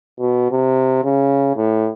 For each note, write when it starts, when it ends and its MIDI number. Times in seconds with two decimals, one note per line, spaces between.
0.19 0.51 47
0.51 1.00 48
1.04 1.54 49
1.56 1.91 45